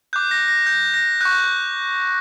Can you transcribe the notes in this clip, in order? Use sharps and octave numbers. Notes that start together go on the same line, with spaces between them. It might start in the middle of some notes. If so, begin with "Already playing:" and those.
D6 F#6 G6
A#6
A#6
G6
A#6
C#6 F#6 G6